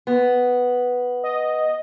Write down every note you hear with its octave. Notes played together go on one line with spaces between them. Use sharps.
B3
D#5